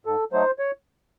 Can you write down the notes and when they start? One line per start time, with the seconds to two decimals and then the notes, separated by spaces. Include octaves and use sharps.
0.05 G#2 A4
0.32 F#3 A3 D#4 C5
0.59 C#5